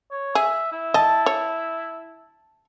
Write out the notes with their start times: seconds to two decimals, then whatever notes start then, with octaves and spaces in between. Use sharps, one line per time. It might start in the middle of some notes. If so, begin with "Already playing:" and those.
0.11 C#5
0.35 G#4 E5
0.72 E4
0.94 D#5 A5
1.26 C#5